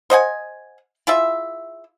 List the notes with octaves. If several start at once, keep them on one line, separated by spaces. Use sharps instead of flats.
C5 D#5 F#5 G#5
E4 F4 G#4 E5